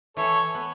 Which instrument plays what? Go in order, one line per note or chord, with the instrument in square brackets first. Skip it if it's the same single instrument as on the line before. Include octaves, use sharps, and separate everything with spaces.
[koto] E3 [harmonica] A4 C#5
[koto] B3